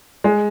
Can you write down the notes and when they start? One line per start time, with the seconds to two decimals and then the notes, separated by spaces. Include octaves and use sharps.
0.24 G#3